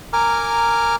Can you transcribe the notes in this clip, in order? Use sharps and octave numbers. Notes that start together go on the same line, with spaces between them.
A#4 G#5 A#5 D6 F6